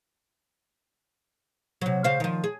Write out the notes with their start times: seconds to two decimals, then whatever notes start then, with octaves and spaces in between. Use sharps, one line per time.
1.81 C3 F#3
2.04 C#3 C5 F5
2.20 D#3 F3
2.44 G#4